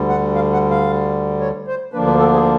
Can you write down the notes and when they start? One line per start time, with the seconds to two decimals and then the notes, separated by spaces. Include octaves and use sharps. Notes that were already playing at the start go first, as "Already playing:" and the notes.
Already playing: D2 D3 G3
0.09 F#5
0.35 F5
0.53 F#5
0.70 F5
1.40 C#5
1.67 C5
1.93 D2 D3 F3 A#3 D4 B4
2.07 B4
2.19 A4
2.34 G#4